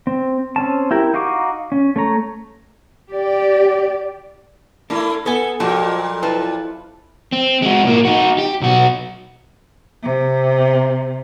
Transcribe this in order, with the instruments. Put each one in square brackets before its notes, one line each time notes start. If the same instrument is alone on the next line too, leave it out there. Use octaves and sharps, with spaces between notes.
[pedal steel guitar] C4
C4 C#4 A5
E4 G4 A#4
D#4 F#4 F5 C#6 D6
C#4
A3 C#5 A#5
[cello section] G4 D5
[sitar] A3 A#3 E4 [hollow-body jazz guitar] D4
[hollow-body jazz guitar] B3 [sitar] A4 [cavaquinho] D#5 G#5
[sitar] F2 A#2 F#3 [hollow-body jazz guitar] F4 F#4 [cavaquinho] A4
[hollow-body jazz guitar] E4 C5 [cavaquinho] F4 A4 B4
[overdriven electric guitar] C4
G#3 F#4
A2 A#3
D#4 F#4
G4
B1 F#4
[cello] C3